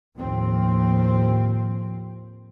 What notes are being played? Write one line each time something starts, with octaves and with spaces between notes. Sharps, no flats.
D#2 A2 F3 C4